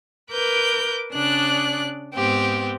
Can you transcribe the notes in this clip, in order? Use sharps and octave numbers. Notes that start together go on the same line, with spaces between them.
A#4 B4 D6 G6
C#3 D4 D5 F#6
G#2 B3 C4 G4